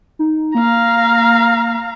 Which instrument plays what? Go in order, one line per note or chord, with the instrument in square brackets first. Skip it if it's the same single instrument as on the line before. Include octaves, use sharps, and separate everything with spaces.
[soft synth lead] D#4
[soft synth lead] A#3 [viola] F5 A#5